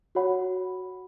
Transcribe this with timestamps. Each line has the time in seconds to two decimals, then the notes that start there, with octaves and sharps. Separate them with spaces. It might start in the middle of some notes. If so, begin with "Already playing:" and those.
0.15 F#4 C#5 F#5 B5